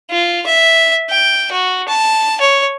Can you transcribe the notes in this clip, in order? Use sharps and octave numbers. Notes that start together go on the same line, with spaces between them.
F4
E5
G5
F#4
A5
C#5